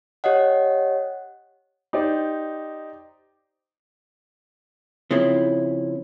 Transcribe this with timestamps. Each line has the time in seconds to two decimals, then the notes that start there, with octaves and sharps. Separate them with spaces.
0.24 G4 C#5 D#5 F#5
1.93 D#4 G4 C5 D5
5.11 C#3 F3 C4 E4